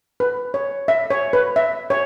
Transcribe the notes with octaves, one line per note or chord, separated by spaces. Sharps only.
B4
C#5
E5
C#5
B4
E5
C#5